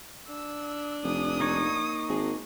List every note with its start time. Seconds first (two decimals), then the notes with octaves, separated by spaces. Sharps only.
0.29 D4 E6
1.03 F1 D#6
1.40 A#3 D#4 C#5
2.09 G#1 G#4